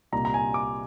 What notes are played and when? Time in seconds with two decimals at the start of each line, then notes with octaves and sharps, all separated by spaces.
0.12 C2 A#2 G3 A#3 D#4 A#5
0.25 A#5
0.34 G#5
0.54 D6